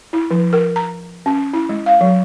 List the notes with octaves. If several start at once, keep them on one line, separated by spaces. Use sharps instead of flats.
E4
F3
A#4
A#5
C#4
E4
G#3
F5
F#3